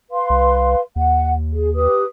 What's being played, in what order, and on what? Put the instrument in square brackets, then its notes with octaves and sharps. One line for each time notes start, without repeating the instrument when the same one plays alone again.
[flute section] B4 F5 C6
[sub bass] C2
[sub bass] D#2 [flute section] F#5
[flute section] G#4
G4 B4 D#6